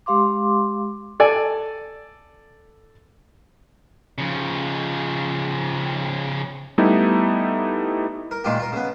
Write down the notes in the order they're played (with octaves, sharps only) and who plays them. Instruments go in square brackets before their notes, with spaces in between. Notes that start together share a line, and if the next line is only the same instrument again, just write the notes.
[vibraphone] G#3 G4 F5 C6 D6
[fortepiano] A4 D5 G#5
[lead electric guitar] C#3 F3
[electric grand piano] G3 A3 B3 D#4 E4
[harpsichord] A#4
A#2 D#3 G#3 D#4 F4 G4
F4 A#4
C#3 B3